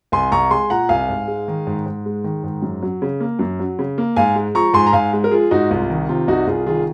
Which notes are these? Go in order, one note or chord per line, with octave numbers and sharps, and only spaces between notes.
C2 G#5 C6
C2 A#5 C#6
G#3 G#5 C6
A#2 F#5 A#5
C2 F5 G#5
G#2
G#3
D#3
G#2
G#2
G#3
D#3
G#2
F#2
F#3
C#3
A#3
F#2
F#3
C#3
A#3
G#2 F5 G#5
G#3
F3 A#5 C#6
G#2 G#5 C6
A#5
G#2 F5 G#5
G#3
A#4
F3 F4 G#4
G#2 D#4 F#4
C2 F4
D#3
C3 F4
C2 D#4 F#4
C2 F4 G#4
D#3 F4 G#4